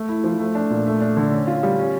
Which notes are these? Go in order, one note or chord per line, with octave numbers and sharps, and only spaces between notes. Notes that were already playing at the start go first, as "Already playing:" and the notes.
Already playing: A3
E4
F3
A3
D4
A#2
A3
D4
D3
C#4
F4
G3
C#4